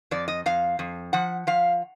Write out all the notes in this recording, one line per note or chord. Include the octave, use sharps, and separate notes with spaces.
F2 D5
D#5
F2 F5
F2
F3 F#5
F3 F5